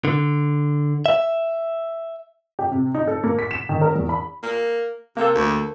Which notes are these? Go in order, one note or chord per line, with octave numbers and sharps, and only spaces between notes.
D3
E5
G4
C3
D#4
A4
A#3
B6
E7
D#3
A#4
E2
B5
A#3
C3 A#3 A4
D2